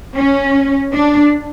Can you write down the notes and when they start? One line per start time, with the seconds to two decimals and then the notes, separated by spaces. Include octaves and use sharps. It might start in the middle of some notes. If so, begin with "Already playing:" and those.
0.18 C#4
0.92 D4